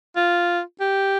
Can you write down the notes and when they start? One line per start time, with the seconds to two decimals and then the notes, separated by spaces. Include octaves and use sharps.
0.16 F4
0.80 G4